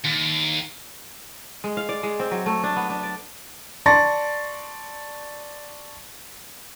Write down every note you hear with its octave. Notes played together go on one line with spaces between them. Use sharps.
D#2
G#3
F5
D5
G#3
C4
F#3
A3
D4
B3
D4
D5
D5 A5 C6 C#6 A6 A#6